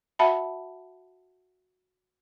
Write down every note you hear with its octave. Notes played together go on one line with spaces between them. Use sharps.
F#4 E5 F#5 A5 B5